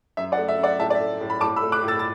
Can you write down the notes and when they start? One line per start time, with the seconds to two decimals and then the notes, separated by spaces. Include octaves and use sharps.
0.17 F#2 E5
0.32 D5 F#5
0.38 A3
0.48 E5
0.58 F#2
0.63 D5 F#5
0.79 A2 E5 A5
0.90 D5
0.95 E5
1.00 A3
1.21 A2
1.30 B5
1.41 A2 A5 D6
1.56 B5 E6
1.62 A3
1.72 D6 F#6
1.83 A2
1.88 E6 A6
1.99 A6